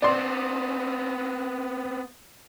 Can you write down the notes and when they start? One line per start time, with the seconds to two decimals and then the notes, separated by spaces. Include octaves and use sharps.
0.02 B3 C4 D5 C6